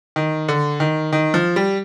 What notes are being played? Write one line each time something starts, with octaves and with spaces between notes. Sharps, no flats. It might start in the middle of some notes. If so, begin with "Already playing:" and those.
D#3
D3
D#3
D#3
F3
G3